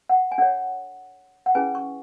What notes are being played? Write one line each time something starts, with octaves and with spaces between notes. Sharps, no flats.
F#5
G#5
D4 A4 C#5 F#5
F#5
C#4 E4 G#4 B4 G#5
C#6